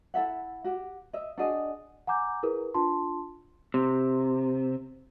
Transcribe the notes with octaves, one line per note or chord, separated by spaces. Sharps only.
E4 A4 E5 F#5
F#4 G4
D#5 E5
D4 F#4 G#4 D#5
F#5 G#5 A#5 D6 G6
E4 G#4 A#4 B4
D4 F4 A5 C6
C3